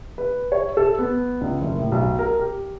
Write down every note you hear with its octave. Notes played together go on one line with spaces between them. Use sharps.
B4
C#5
A4
B3
C#2
F#1
A2
B1
A#4
G4